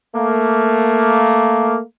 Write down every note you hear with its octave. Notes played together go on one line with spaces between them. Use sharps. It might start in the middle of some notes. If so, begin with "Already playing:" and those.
A3 A#3